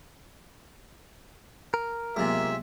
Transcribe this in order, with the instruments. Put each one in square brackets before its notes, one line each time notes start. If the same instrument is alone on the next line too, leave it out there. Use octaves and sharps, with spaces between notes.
[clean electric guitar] A#4
[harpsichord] C#2 C3 [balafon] F#3 A#3 B3 [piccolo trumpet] E5